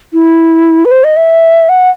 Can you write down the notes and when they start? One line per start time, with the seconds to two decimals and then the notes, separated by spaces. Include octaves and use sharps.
0.13 E4
0.85 B4
0.91 C5
1.04 D#5
1.17 E5
1.69 F#5